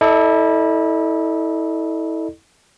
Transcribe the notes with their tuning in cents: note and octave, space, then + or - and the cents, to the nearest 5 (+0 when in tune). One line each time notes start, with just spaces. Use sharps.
E4 -30 A4 +0 D5 +45